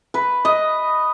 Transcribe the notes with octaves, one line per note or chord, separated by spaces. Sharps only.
B4
D#5